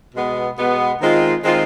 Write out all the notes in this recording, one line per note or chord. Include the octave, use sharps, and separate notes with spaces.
B2 G#3 B3
B2 G#3 B3
D#3 G#3 C4 F4
D#3 G#3 C4 F4